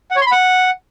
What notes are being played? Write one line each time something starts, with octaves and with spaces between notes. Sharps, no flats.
F#5
C#5
C6
B5
F#5